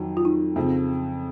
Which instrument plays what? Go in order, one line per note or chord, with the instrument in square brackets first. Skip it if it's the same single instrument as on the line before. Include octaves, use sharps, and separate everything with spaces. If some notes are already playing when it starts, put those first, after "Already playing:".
Already playing: [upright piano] F2 D#3 F#3
[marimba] F4
D#4
[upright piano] F2 C#3 F3 C4